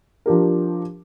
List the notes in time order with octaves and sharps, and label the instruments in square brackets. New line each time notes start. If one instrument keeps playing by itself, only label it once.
[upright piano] F3 D4 G4 A#4